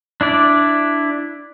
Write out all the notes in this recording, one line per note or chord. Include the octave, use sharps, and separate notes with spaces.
D4 E4 D5